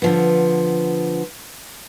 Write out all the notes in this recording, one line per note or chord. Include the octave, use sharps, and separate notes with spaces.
D3 F3 B3